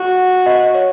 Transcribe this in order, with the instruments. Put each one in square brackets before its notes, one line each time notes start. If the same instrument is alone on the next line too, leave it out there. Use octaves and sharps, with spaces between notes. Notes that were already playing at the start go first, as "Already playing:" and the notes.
Already playing: [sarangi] F#4
[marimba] D#5
C#5